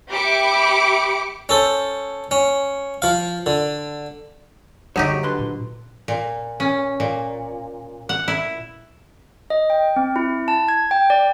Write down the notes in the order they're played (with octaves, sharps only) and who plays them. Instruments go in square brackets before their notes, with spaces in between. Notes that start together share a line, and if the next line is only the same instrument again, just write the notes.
[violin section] G4 E5 B5 D6 C#7 D7
[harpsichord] C#4 A4 C5
C#4
F3 F5
D3
[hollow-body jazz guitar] F#2 G#4 C#5 [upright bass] D3 G3 [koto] F#3 D#4 G4
[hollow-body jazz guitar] D3 B4 C6
[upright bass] A#2
[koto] A#2
C#4
A#2
F#5
E4
[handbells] D#5
G5
C4
E4
A5
G#6
G5
D5